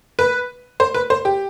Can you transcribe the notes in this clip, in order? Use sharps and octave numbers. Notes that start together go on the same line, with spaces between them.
B4
C5
B4
C5
G4